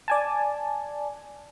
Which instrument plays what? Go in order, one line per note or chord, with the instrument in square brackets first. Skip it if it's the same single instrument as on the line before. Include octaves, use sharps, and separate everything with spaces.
[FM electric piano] D5 G#5 A5